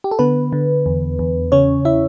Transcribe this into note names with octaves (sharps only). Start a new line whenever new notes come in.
G4
A4
D3 B3 B4
D3
E2
E2
C#3 C#4 C#5
E4 E5